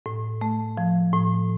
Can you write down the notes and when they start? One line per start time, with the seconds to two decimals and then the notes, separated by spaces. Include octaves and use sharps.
0.06 A2
0.41 A3
0.77 F3
1.13 A2